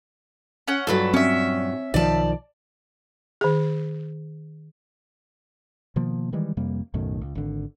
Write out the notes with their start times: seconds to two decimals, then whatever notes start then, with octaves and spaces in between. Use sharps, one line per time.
0.68 C#4 F#5
0.87 G2 A#2 F#3 A4 B4
1.14 C4 C#4 E5
1.94 B1 D#3 F3 D5 A5
3.41 D#3 G#4
5.96 B2 D#3 F3 A#3
6.32 D#3 E3 G3 G#3
6.57 F2 C3 G3 A#3
6.94 B1 F#2 A2 D#3
7.21 C#2
7.35 G#1 D3